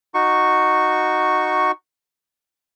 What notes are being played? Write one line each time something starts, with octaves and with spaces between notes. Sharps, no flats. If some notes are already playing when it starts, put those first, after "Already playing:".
D#4 F#4 C#6